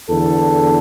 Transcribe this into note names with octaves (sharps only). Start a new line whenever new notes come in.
E2 D3 A4